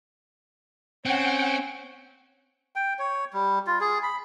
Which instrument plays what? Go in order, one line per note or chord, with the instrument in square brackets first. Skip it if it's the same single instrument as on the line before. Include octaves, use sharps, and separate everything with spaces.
[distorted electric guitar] C4 [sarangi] C#4 [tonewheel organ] F#5 G5
[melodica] G5
C#5
G3
F4
G#4
B5